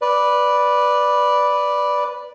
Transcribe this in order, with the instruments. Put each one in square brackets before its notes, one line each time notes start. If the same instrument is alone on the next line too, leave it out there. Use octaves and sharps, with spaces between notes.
[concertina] B4 D5